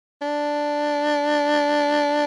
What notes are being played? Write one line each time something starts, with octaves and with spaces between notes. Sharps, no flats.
D4